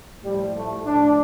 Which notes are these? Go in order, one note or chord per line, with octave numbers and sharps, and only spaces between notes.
A2 F3 G3
A3
A2 F3 D4